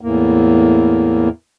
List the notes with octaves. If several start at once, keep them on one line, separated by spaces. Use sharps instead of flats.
E2 A2 A#3